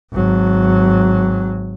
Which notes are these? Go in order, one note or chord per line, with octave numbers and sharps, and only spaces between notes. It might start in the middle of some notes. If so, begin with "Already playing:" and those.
G#1 F#3